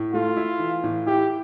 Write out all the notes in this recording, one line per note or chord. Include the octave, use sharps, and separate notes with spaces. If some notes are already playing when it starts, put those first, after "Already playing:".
Already playing: A2
A3 F4
E4
E3
A2
E4 G4